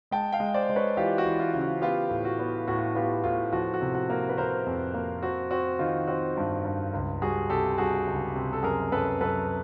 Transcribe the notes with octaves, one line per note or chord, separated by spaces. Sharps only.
G#3 G5 A5
F5 G5
G#3
C5 D5
G#3
B4 C#5
E3 F4 G4
F#4
E3
F4
C#3
F#4
B3 F4 G4
A2
F#4
B3
A2 F#4
B3 F4 G4
A2 F4
F3 F#4
F#4
C3
F#4
A#3
B4
C3 A#4 C5
F2
A#3
C4 F#4
C4 F#4
D#3 F4
C4 F#4
G2
G2
C#2
G3 F#4 G#4
C3 G4 A4
G3 F#4 G#4
C#2
C3
A4
F#2 G#4 A#4
F#2 A4 B4
F#2 A4 B4